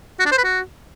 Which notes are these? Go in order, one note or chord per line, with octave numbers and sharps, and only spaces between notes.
F#4
D4
C5
B4
F#4